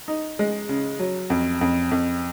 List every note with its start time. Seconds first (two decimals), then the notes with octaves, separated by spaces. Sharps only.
0.08 D#4
0.39 G#3
0.69 C#3
0.99 F#3
1.30 F2
1.61 F2
1.91 F2